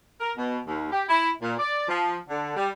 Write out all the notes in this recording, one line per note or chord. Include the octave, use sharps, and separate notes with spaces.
A#4
B2
D#2
G4
E4
A#2
D5
F3
D3
G3